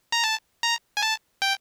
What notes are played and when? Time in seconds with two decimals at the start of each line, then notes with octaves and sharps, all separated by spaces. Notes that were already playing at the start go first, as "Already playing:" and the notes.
0.12 A#5
0.24 A5
0.63 A#5
0.97 G#5
1.02 A5
1.42 G5